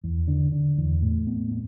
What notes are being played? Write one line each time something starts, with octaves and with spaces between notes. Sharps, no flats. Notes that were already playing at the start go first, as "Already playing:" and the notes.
E2
D3
D3
E2
A2
B3
B3